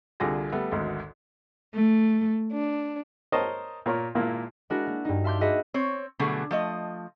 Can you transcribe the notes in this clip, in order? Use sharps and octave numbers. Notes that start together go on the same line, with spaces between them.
C2 D3 F4 G4 G#4 A#6
G3 A3 B3
G#1 D2 G#2
A3
D4
A#4 C5 C#5 D#5 A5
A#2 A#4 C#5
G#1 A#2 A#3 E4
G#3 D4 E4 F#4 A#4
A#3
G2 D#4
E5 F5 A5 C6 D6 G6
F#4 G#4 B4 D#5 E5
C4 C#5
B2 D3 F#3 G3 A3 G#4
F3 A3 D#5